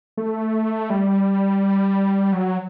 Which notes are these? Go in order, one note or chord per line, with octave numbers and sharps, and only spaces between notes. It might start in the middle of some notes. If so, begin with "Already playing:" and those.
A3
G3
F#3